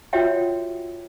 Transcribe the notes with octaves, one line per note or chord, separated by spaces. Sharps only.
F4 F#4 C#5 E5 F#5 G5